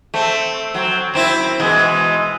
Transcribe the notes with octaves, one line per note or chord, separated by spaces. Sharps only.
A3 C4
F#3 C4
F#2 C4 E4
B2 E3 G#3